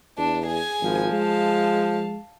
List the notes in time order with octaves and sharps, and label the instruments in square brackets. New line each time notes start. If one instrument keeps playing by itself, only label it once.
[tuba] E2 [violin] D4
[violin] G#4 G#5
[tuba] G#1 [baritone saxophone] F3
[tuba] G#3 [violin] F5 A5